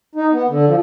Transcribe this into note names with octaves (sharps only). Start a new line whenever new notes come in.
D#4
B3
D3
F3